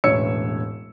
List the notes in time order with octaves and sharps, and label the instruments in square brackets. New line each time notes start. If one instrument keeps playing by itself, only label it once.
[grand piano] E1 A1 C#5 E6 C#7